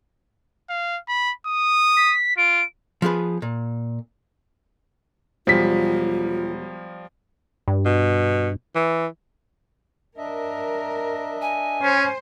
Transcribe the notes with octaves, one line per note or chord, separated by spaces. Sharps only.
F5
B5
D#6
B6
F4 D7
F3 B3 G#4 B4
A#2
E1 F3 G3 F4 B6
G2
B2
E3
D4 A#4 D#5 E5
G#5
C#4 C5